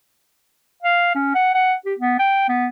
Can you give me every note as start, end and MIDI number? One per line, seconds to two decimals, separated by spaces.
0.83 1.11 77
1.15 1.34 61
1.35 1.53 78
1.55 1.75 78
1.85 1.94 67
1.99 2.15 59
2.19 2.46 79
2.49 2.68 59